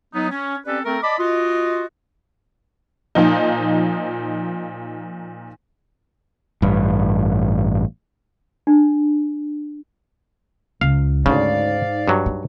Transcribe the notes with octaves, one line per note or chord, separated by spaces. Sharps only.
F#3 B3 D#4
C#4
C4 C#4 G4 A4 B4 D5
A3 C4 A4 A#4
D5 D#5 A5 B5 D6
F4 F#4 D#5
A#2 F3 D#4
A1 G2
D4
C#2 F5
D2 G#2 C#3 D#4 D5 F5
G2 F#3
D#4